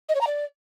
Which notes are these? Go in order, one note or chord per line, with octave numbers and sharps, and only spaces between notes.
D#5
C#5
A#5
D5